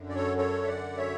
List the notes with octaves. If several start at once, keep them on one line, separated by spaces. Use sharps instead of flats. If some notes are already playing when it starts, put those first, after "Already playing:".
Already playing: F#2 D3
D5
A4 C#5
A4 C#5
E5
D5 F#5
C#5 E5